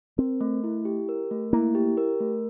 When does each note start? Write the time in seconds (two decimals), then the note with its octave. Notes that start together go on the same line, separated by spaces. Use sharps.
0.18 C4 A#4
0.41 A3
0.64 E4
0.85 G4
1.09 A#4
1.31 A3
1.53 A#3 E4
1.75 G4
1.97 A#4
2.20 A3